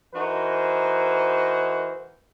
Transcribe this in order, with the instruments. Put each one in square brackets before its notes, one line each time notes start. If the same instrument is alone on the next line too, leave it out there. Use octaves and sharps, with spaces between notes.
[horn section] E3 D#4 F#4 A#4 C5